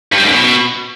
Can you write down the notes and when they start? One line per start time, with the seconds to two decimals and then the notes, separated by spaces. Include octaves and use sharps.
0.12 G2
0.18 G3
0.23 G#2
0.29 F#2
0.34 B2